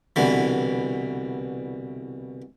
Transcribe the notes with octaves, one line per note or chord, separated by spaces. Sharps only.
C2 B2 D3 E3